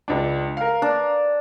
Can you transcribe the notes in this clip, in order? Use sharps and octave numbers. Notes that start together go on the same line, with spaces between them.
C#2 D4
A#4 F5
D4